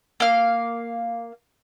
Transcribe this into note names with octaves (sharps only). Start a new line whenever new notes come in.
A#3 F5